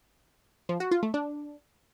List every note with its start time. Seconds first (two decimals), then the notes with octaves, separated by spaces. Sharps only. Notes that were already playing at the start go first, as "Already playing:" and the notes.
0.69 F3
0.80 F#4
0.91 F4
1.03 A3
1.14 D4